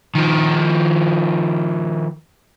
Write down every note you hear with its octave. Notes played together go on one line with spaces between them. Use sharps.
D#3 F3